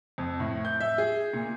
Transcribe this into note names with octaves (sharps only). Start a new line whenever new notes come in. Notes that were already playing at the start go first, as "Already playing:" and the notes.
F2
A2
G6
E5
G#4
A#2